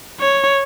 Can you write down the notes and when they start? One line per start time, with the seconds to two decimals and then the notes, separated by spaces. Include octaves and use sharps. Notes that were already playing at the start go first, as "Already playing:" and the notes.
0.20 C#5